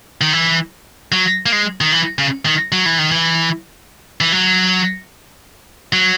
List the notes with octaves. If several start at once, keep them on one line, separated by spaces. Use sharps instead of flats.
D#3
E3
F#3
A#3
G#3
D#3
E3
C#3
D#3
F#3
E3
D#3
E3
E3
F#3
F#3